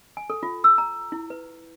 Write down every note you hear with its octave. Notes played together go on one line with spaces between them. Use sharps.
G#5
A4
F4
E6
A#5
E4
B4